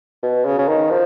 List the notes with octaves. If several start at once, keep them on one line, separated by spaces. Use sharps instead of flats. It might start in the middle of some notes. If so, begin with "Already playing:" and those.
B2
C#3
C#3
D#3
F3